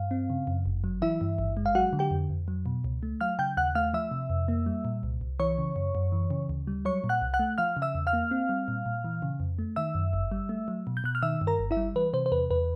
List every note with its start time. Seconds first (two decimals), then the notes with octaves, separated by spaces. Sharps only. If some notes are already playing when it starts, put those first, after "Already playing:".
Already playing: G2 F5
0.11 C4
0.30 C#3
0.47 F#2
0.66 G1
0.84 F#3
1.02 E3 E4 E5
1.21 G2
1.38 G#1
1.57 G#3
1.66 F5
1.75 F#3 F#4 F#5
1.93 D3
1.99 G4 G5
2.11 F2
2.30 F2
2.48 F#3
2.66 B2
2.84 C#2
3.03 A3
3.21 F#3 F5 F6
3.39 C#3 G5 G6
3.57 D#2 F#5 F#6
3.75 A3 F5 F6
3.94 F3 E5 E6
4.11 C3
4.30 F2
4.48 A#3
4.66 G3
4.85 A#2
5.03 C2
5.21 C2
5.39 E3 C#5 C#6
5.58 C#3
5.76 F#2
5.95 F#2
6.12 E3
6.31 C#3
6.49 D2
6.67 G3
6.85 F#3 C#5 C#6
7.04 A#2
7.09 F#5 F#6
7.21 C2
7.34 F#5 F#6
7.39 A3
7.58 F3 F5 F6
7.77 C#3
7.82 E5 E6
7.95 E2
8.07 F5 F6
8.13 A#3
8.31 C4
8.49 G3
8.68 A#2
8.86 A#2
9.04 E3
9.22 C#3
9.40 F2
9.59 A3
9.76 D#3 E5 E6
9.95 F#2
10.13 G1
10.31 G3
10.49 A3
10.68 F#3
10.87 B2
10.97 G6
11.04 B2 F#6
11.15 F6
11.22 D#3 E5 E6
11.41 G2
11.47 A#4 A#5
11.59 G1
11.71 E4 E5
11.77 G3
11.95 E3 B4
12.13 C3 C5
12.26 C5
12.32 E2 B4
12.50 E2 B4